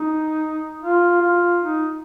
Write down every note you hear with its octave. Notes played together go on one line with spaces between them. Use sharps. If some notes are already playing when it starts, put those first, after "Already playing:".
Already playing: D#4
F4
F4
D#4